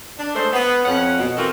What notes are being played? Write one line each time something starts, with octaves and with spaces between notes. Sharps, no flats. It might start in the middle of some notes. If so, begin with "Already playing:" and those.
D4
G#3 A3 C5
B3
F2 C#4 F#5
B2
E3 C4 F4 F#4 A4 A#4